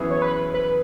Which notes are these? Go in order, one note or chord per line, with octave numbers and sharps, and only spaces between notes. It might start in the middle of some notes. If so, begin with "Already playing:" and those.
Already playing: F#2 E3 B3 E4 G#4
C#5
B4
B4